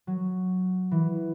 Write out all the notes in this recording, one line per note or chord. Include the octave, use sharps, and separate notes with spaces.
F#3
E3